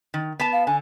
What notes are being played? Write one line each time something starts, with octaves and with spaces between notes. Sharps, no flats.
D#3
B3 A5
F5
D3 G#5